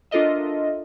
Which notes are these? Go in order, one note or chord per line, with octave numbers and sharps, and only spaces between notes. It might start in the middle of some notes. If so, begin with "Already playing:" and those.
D4 F4 A4 A#4 D#5 E5